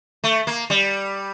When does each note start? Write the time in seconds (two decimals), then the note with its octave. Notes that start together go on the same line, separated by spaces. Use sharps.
0.24 A3
0.47 A#3
0.70 G3